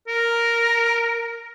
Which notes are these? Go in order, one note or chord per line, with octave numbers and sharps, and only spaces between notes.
A#4